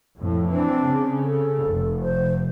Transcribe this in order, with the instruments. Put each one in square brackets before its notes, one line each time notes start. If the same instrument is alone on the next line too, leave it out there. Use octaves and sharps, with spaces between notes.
[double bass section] F2 A2
[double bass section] E3 C4 [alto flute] D4
[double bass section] C#3
[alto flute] A4
[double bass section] F1
[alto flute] C5